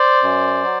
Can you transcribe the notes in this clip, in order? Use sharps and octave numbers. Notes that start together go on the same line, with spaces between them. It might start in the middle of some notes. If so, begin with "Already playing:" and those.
Already playing: C5 D5
F#2
F#3